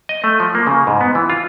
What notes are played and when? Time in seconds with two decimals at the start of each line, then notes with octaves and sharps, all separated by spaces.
0.09 D#5
0.24 A3
0.40 F3
0.55 A#3
0.67 C#3
0.87 G#2
1.01 B3
1.15 E3
1.30 F4